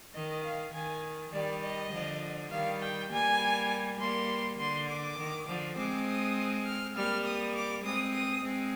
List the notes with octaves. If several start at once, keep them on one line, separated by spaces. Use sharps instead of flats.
D#3 D#5
F5
D#3 G#5
D#3 G3 D5
D#5
D3 F3
D#3 G3 F5
G5
G3 A#3 G#5
G3 A#3 C6
D3 C6
D6
D#3
D3 F3
G#3 C4 D6
D#6
F6
G3 A#3 F6
D#6
D6
G#3 C4 D#6
D#6
G#3 C4